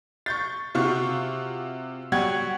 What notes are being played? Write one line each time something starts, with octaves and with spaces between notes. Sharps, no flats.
C#6 G6 A6
C3 F4 F#4 C#6
F#3 G3 F#5 G5 C#6 G#6